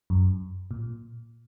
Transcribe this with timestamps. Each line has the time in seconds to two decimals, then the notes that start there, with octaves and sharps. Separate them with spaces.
0.10 F#2
0.71 A#2